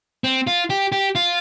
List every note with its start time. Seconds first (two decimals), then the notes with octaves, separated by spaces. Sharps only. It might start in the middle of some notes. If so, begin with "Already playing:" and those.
0.24 C4
0.47 F4
0.70 G4
0.92 G4
1.15 F4